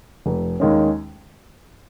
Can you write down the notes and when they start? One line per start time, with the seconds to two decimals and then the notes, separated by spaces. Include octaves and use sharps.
0.26 F1
0.60 D#2 D#3 G#3 C#4